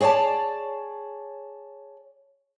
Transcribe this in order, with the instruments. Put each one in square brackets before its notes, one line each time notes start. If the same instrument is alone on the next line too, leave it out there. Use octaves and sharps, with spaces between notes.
[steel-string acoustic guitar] G#4 C#5 D5 G#5 A5